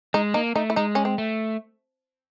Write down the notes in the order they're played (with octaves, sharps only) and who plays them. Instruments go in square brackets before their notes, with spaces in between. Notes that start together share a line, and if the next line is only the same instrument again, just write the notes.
[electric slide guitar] G#3 [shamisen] D#4
[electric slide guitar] A#3 [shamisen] D#4
[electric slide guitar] A3 [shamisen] D#4
[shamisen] E4
[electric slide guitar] G#3 [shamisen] D#4
[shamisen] C#4
C4
[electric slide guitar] A3